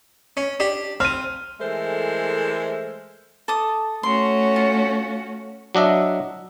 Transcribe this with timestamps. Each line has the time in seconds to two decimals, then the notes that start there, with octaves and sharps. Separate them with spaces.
0.37 C#4
0.60 D4 G4
1.00 C4 F6 D#7
1.60 E3 G#3 A3 A4 A#4 C5
3.48 A4 D6 D#6
4.03 A3 C#4 F#4 C6
4.56 F4
5.75 F#3 D4 D#5 E5